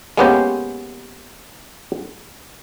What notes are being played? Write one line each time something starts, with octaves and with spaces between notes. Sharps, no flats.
G#3 A#3 B3 C#4 G4 C5